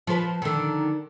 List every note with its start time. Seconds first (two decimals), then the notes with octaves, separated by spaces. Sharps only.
0.07 F3 B4
0.42 D3 D#3